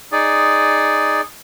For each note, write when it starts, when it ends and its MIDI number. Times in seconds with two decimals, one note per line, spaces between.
0.12 1.21 63
0.12 1.21 68
0.12 1.21 74